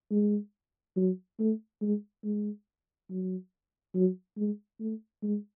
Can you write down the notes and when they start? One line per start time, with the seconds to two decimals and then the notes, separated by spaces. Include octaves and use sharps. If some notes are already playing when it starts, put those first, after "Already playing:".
0.11 G#3
0.97 F#3
1.39 A3
1.82 G#3
2.24 G#3
3.10 F#3
3.95 F#3
4.37 G#3
4.80 A3
5.23 G#3